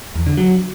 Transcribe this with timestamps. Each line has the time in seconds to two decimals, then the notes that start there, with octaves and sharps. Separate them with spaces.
0.15 E2
0.26 D3
0.37 F#3